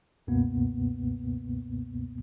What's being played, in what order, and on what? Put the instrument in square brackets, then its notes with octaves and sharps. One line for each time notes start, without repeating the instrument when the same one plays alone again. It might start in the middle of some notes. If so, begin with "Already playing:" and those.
[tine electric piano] C#2 F#2 B2 A#3 B3